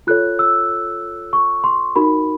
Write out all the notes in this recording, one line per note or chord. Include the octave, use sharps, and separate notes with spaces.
F4 A4 C#5 F#6
E6
C#6
C6
D#4 F#4 A#4 B5